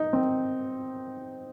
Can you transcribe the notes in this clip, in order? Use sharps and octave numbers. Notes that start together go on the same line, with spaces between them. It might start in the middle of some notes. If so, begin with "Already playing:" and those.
Already playing: D#4
C4